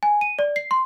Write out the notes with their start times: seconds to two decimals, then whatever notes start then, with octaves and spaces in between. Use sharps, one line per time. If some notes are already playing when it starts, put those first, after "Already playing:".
0.03 G#5
0.21 D#7
0.39 D5
0.56 C7
0.71 C6